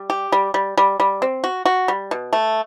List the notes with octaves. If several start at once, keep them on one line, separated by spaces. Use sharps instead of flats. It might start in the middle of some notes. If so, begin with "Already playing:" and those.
Already playing: G3
G4
G3
G3
G3
G3
C4
F#4
F#4
G3
B2
A3